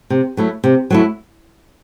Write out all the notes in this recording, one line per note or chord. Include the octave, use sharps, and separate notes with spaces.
C3
F#3 A3 E4
C3
F#3 A3 E4